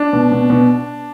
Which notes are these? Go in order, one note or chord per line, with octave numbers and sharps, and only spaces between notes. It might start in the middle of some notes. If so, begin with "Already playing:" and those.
Already playing: D4
B2
B2
B2